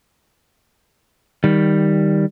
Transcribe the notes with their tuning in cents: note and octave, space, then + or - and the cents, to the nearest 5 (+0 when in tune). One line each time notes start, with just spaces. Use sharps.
D#3 +0 G3 +0